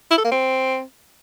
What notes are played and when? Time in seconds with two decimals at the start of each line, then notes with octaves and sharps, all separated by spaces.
0.11 E4
0.18 A4
0.25 A#3
0.32 C4